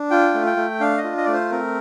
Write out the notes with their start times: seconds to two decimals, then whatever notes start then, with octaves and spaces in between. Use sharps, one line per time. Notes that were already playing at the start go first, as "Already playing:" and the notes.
Already playing: D4
0.11 F4 G5
0.34 A3
0.46 G5
0.57 A3
0.80 D4 F5
0.98 D#5
1.04 F4
1.17 D#5
1.25 D5
1.28 A3
1.33 C5
1.51 C4 A#4